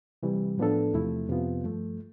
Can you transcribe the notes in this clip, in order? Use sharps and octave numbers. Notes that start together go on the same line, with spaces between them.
C3 E3 G3
A2 F3 B3 D4 A4
E2 C3 F3 A3 E4
F2 C3 F3 B3 F4
G2 F3 A3